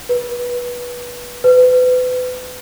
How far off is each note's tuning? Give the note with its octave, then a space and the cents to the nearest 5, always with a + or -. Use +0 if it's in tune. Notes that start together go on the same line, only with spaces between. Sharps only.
B4 -15
B4 +35